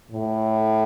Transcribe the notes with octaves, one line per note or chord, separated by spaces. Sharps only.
A2